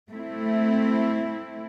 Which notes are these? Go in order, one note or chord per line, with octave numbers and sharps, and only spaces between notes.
A3 C4 E4